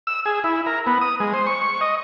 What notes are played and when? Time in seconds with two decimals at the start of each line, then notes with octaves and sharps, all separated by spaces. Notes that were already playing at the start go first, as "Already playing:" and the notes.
0.07 E6
0.26 G#4
0.44 E4
0.66 A#4
0.86 B3
1.01 D#6
1.20 G#3
1.34 C5
1.47 C#6
1.81 D#5